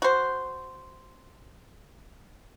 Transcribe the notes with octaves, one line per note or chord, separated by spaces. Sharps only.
F#4 C5